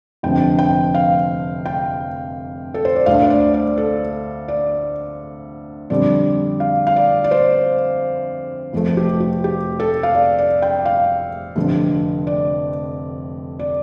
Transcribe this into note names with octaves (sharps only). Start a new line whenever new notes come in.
F1 F2 D3 F3 G5
G5
F5
G5
A4
C5
D5
D2 D3 A3 F5
C5
D5
D5
A4
D5
F2 D3 G3 D5
F5
F5
D5
D5
C5
F1 F2 F3 A3
G4
G4
G4
A4
F5
D5
D5
G5
F5
F1 F2 D3
D5
D5